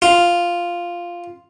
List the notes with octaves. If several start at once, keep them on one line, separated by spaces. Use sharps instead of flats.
F4